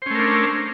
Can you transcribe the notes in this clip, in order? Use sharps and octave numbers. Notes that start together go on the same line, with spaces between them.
A3 C#4 D4 A#4 C5